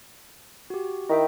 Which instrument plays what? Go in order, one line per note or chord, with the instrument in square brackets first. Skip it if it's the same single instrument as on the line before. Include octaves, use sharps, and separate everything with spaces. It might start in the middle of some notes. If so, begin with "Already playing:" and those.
[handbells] F#4 G4
[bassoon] D#3 [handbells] E4 E5 G5